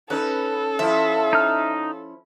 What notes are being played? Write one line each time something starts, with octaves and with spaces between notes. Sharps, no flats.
C#4 D#4 A4 B4
F3 C#4 E4 E5
D#4 F6